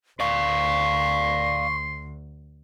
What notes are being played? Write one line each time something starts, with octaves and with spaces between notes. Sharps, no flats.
D2 D5 F5 C6 C#6